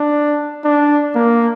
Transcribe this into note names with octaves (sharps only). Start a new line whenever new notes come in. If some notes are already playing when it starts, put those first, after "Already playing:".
Already playing: D4
D4
A#3